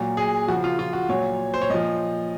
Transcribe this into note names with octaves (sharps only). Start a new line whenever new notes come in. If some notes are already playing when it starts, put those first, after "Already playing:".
Already playing: A#2 F#3
G#4
C#3 F3 F#4
F4
F4
F#4
A#2 F#3 C#5
C5
C#5
A#2 F3 D#5